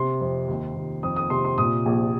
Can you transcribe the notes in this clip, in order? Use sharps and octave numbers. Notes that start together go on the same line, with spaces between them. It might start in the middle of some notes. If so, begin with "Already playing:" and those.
Already playing: C3 C6
F2
D#2
D#2
F2 D#6
D#6
C3 C6
C6
A#2 D#6
A#1